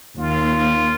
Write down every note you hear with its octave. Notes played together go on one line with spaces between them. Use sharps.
D#2 F4